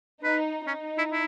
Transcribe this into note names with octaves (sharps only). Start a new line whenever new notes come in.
D#4 B4
C#4 D#4
E4
E4